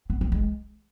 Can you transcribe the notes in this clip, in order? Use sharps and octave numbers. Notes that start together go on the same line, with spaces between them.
B3
A#3
G#3